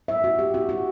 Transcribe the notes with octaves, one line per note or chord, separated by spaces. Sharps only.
F#3 B3 E4 E5
F#4
G4
F#3 B3 E4 F#4
F#4